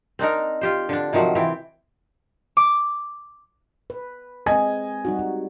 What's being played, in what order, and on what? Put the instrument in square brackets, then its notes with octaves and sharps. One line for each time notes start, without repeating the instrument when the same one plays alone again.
[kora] C4 D4 D#4 A#4
F4 G4 C5
D3 D4
C3 D#3 F3 F#3
E3 C4 G4
[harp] D6
[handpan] B4
[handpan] G#3 C4 [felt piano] D#5 G#5
[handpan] G3 D#4 F#4